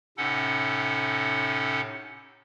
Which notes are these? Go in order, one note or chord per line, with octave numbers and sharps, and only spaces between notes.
A2 C3 C#4 D#4 A4 F#5